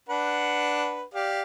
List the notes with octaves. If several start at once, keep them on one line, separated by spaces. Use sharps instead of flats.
D4 B4 F#5
G4 D5 F5